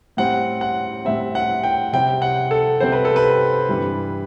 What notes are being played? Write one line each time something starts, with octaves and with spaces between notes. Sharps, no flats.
A2 G3 C4 F#5
F#5
A2 G3 C4 E5
F#5
G5
C3 G3 C4 G5
F#5
A4
C3 G3 C4 C5
B4
A4
B4
G2 E3 G3